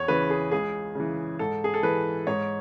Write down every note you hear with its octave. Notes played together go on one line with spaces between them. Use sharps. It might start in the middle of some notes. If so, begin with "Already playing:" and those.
Already playing: E2 C#5
C#3 E3 B4
G#4
C#2 G#4
C#3 E3
G#2 A4
G#4
A4
E3 B4
G#2 C#5